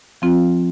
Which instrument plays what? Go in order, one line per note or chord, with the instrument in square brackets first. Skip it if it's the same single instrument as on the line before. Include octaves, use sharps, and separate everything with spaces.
[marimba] F3 C4 F4